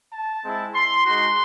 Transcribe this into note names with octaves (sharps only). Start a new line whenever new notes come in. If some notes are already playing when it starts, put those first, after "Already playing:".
A5
G#3 C4 E4
C6
G#3 D#4 F#4 C6